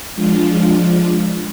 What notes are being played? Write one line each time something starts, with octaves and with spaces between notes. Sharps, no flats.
F3 G#3 D4 F4